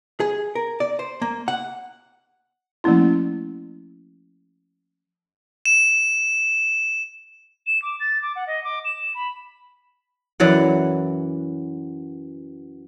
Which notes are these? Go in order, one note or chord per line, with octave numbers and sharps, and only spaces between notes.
G#4
A#4
D5
C5
A#3
F#5
F3 A3 A#3 C#4 E4
E7
E7
D6
A6
D6
F#5
D#5
D6
E7
B5
F#2 E3 F#3 D5 F#5